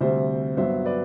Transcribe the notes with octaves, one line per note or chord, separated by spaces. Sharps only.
D2 C3 G3 C4 C5 E5
G2 F#3 B3 C5 E5
B4 D5